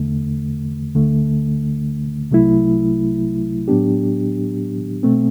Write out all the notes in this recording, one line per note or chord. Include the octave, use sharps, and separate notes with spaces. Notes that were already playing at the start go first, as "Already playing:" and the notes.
Already playing: E2 D3 A3
D2 D3 A3
C2 C3 F#3 A3 E4
A2 F#3 B3 D4 G4
B2 A3 C4